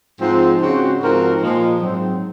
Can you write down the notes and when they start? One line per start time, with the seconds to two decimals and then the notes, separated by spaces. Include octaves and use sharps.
0.20 G#2 F3 C4
0.60 C#3 G#3 C4 F#4
1.00 G#2 F3 C4 F#4 A#4
1.41 A#2 F3 G#3
1.81 G#2 F#3 C4